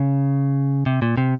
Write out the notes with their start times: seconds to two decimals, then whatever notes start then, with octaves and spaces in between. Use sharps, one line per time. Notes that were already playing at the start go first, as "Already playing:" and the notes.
Already playing: C#3
0.86 C3
1.02 A#2
1.17 C3